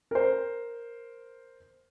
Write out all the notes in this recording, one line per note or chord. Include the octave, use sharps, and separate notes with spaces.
A#4 C5